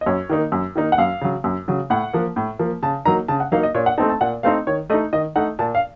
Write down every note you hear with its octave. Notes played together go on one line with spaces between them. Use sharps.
D#5
F#2 C#5
D#3 A#3 D#4
F#2
D#3 A#3 D#4
F#5
F#2 F5
C#3 F#3
F#2
C#3 F#3
A2 F#5
F3 A#3
A2
F3 A#3
C#3 A5
F#3 A#3 D#4 A#5
C#3 A5
F#5
F#3 A#3 D#4 F5
D#5
A#2 C#5
F#5
A3 C4 D#4 A5
A5
A#2 F#5
A3 C4 D#4 F5
D#3 C#5
A3 D#4 D#5
D#3 D#5
A3 D#4 F#5
A#2 A5
F5